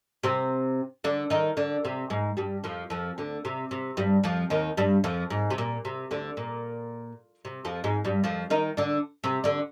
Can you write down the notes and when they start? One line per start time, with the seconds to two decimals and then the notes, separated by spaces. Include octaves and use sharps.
0.23 C3 C4
1.04 D3 D4
1.30 D#3 D#4
1.57 D3 D4
1.85 C3 C4
2.10 G#2 G#3
2.37 G2 G3
2.64 F2 F3
2.90 F2 F3
3.18 D2 D3
3.45 C3
3.71 C3
3.97 G2 G3
4.24 F2 F3
4.50 D#2 D#3
4.77 G2 G3
5.04 F2 F3
5.30 G#2
5.50 C3
5.58 A#2
5.85 C3
6.11 D2 D3
6.37 A#2
7.45 C3
7.65 F2 F3
7.84 G#2 G#3
8.05 G2 G3
8.24 F2 F3
8.50 D#3 D#4
8.77 D3 D4
9.24 C3 C4
9.44 D3 D4